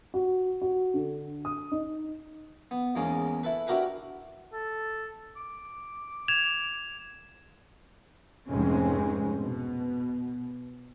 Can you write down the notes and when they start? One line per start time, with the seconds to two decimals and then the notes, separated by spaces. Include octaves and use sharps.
0.14 F#4
0.62 F#4
0.94 D3
1.45 D#6
1.72 D#4
2.71 B3
2.95 E2 G#2 A#3 C#4 G#5
3.43 E4 A4 B4
3.67 D4 E4 F#4 G4 A#4 B4
4.53 A4
5.37 D6
6.28 G#6 E7 F7
8.50 F1 G#2 G#3 C4 C#4
9.40 B2